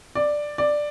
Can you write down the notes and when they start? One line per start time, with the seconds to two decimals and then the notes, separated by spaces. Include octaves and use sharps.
0.15 D5
0.58 D5